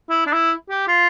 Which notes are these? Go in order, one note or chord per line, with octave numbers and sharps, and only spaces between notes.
E4
D4
E4
G4
F4